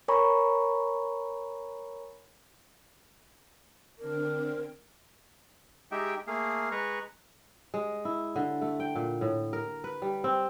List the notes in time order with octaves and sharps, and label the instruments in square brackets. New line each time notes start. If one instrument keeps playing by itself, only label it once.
[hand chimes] A#4 C#5 G#5 A#5 B5 C#6
[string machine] D3 C4 D4 [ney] A#4
[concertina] G#3 D#4 G4 E5 G5
A3 A#3 G#4 F5
G#3 B4 A#5 C#6
[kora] G#3
E4
D3
A3
G5
A#2
A2
A#4
B4
G3
C4